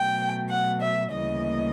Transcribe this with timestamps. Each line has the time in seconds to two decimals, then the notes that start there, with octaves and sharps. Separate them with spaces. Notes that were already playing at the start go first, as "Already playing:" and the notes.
Already playing: B2 F#3 A3 G5
0.50 F#5
0.81 E5
1.12 D2 C#3 E3 G3 A#3 D#5